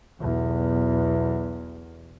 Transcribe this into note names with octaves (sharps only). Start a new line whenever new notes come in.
B1 E2